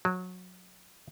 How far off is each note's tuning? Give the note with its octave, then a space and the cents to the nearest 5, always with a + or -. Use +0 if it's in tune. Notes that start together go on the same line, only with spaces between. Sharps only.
F#3 -20